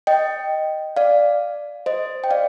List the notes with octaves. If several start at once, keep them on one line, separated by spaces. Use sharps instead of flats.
D#5 G5
D5 F5
C5 D#5
G5
D5 F5